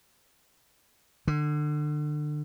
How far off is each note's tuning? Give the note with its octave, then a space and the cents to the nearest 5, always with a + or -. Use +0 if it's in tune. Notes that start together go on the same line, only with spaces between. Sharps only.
D3 +30